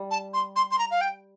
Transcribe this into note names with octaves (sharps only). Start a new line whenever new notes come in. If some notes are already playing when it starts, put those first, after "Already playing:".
Already playing: G3
A5
C6
C6
C6
A#5
F5
G5